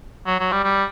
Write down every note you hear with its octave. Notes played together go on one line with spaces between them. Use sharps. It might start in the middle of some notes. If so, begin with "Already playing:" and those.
F#3
F#3
G3
G3